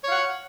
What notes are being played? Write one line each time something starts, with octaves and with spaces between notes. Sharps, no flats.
C#5 F5 F#5